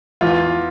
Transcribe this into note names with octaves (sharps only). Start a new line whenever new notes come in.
E2 F4